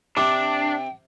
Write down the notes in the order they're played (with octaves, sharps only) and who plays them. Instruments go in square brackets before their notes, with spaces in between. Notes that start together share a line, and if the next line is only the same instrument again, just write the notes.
[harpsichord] C3 [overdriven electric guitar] D4 [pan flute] G5 [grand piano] D6